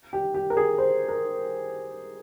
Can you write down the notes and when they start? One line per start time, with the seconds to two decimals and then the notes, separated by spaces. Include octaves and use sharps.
0.13 G4
0.34 G4
0.50 A#4
0.57 G#4
0.78 C5
1.09 A#4